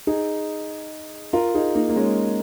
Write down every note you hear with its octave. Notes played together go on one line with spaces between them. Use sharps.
D#4 G#4
F4 A#4
D#4 G#4
A#3 D#4
A#3
G#3 C#4